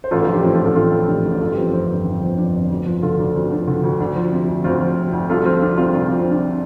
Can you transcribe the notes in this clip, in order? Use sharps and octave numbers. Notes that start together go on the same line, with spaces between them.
C5
A1 F4 A4
F4 A4
F3
D4 G4
A2 C4 F4
F4 A4
A1
F4 A4
A1 F4 A4
F3
A2 D4 G4
A1
G1 F4 A4
G4
F3 C4 F4
F2 C4
G1
G1
F3 C4
F2 D4
G1
D2
F3
D3 F4 A4
D2 D4
D2 C4
F3 D4
D3
D2
D2 D4
F3
C3
D2
D2 C4 F4
F3
C3
D2
C2 F4 A4
F3 C4 F4
C3 D4
C2 C4 F4
C2 F4
F3 D4
C4
C3 D4